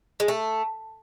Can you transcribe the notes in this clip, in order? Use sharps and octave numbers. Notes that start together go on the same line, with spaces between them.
G#3
A3